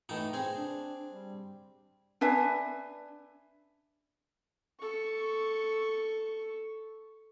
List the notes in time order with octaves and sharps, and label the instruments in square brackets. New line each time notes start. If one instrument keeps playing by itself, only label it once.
[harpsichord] A2 E3 D#4
C4 G#4
[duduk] D4
G3
[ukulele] D4 B4 E5 G#5
[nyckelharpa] A4 C#6